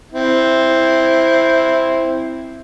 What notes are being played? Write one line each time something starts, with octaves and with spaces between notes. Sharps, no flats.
C4 E4